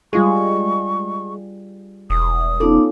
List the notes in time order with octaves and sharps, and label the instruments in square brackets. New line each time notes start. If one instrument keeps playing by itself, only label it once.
[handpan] G3 F4 G#4 [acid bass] G#3 [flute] C#6
[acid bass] E1 [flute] D#6
[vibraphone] B3 D#4 D6 [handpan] C#4 F4 A4